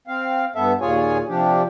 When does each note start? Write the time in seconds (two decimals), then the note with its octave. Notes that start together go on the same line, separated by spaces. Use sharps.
0.08 C4 F5
0.56 G2 B3 A4 E5
0.81 D#2 A#2 F4 G#4 C#5 G#5
1.29 C3 F3 D4 G4